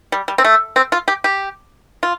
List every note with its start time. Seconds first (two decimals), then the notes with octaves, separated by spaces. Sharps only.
0.12 G3
0.28 G3
0.38 C4
0.45 A3
0.76 C4
0.92 F4
1.08 G4
1.24 G4
2.03 F4